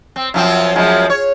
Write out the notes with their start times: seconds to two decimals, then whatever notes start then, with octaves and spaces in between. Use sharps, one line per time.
0.16 C4
0.34 F#2 F3 C4
0.75 F#2 F3 G#3
1.10 C#5